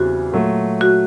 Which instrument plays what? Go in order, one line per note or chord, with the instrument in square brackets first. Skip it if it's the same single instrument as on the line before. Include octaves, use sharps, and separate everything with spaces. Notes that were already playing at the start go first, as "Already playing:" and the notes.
Already playing: [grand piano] E2 C#3 E3 G3 C4 [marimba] F#4
[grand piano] A#2 F#3 A3
[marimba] F#4